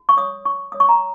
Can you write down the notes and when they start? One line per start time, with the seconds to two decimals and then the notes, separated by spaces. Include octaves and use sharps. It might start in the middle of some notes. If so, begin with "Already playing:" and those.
Already playing: F#4
0.09 C#6
0.17 C#5 D#6
0.45 F#4 C#6
0.72 C#5 D#6
0.80 C#6
0.89 A#5